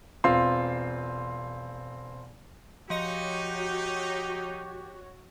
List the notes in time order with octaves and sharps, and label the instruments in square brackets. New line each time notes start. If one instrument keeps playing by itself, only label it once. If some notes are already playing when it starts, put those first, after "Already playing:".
[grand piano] E1 C4 F4 C6
[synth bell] F3 D#5 C#7 [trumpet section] D#4 [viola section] F#4 C#5 [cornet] G4